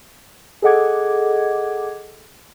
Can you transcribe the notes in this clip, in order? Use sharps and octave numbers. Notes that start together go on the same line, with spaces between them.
G#4 A4 D#5 F#5 D6 G#6